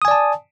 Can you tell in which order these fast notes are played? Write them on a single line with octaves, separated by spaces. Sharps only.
D#6 G#5 D5 A5